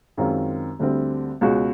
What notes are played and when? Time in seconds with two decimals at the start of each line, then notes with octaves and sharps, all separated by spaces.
0.17 F#2 D#3 G#3 C4 F4
0.79 D2 D3 G3 C4
1.41 C#2 B2 G#3 C#4 F#4